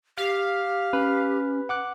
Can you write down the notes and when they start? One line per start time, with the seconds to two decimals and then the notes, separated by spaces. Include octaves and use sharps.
0.17 G4 F5
0.93 C#4 B4
1.69 F#5 D6 F#6